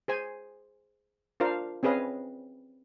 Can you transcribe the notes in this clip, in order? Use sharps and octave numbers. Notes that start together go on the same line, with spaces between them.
G#4 C5 G#5
D4 F4 A#4 C5 F5
C4 C#4 G#4 B4 D#5 F5